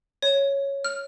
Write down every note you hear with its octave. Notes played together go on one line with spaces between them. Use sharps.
C#5
F6